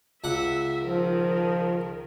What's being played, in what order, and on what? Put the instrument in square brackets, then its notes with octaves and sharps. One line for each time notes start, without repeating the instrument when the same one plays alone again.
[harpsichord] C#2 F#5 [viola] E5
[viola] D#3 A#4 [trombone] F3